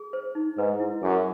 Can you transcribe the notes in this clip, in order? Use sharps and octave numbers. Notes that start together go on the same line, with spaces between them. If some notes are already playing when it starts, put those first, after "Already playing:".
Already playing: G#4
C5
D#4
G#2 B4
E4
F#2 G#4